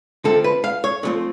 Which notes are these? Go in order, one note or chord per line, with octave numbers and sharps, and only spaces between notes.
D3 F3 A3 C4 A4
B4
F5
C#5
D3 F3 A3 C4